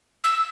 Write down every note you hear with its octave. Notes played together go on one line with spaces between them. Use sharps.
E6